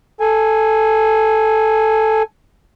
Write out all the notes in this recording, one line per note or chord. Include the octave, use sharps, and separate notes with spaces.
A4 G#5